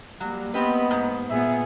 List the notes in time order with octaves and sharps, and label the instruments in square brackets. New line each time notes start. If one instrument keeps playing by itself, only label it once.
[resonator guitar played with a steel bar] F#3 [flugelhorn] G3 [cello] A#3
[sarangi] B3 [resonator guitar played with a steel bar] C4 G4 B4 [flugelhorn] D#5
[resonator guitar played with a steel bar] G#2
[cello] A#2 B3 [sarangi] G#4 [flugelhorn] E5